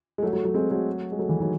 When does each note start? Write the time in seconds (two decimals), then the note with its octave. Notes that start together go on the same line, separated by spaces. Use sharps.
0.18 G#3
0.22 F#3 A3
0.33 F#3 A3
0.44 F#3 A3
0.54 G#3 C4
0.71 F#3 A3
1.12 G#3
1.19 F#3 A3
1.29 E3 G#3
1.40 D#3 F#3